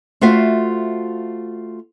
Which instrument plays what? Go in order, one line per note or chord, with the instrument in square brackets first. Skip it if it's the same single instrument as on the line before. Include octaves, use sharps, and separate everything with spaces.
[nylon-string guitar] A3 F4 F#4 C5 E5 F5